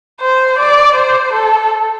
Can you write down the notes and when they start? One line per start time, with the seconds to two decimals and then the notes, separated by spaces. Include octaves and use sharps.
0.21 C5
0.58 D5
0.95 C5
1.33 A4